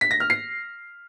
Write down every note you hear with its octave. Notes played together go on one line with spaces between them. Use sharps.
B6
A#6
F6
C7